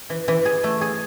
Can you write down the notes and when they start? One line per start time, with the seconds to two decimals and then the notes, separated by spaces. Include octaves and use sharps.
0.10 E3
0.28 E3
0.45 G#4
0.64 A3
0.81 G#4